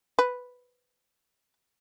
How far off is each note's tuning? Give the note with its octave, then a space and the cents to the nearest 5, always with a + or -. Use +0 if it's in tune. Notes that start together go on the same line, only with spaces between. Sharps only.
B4 +0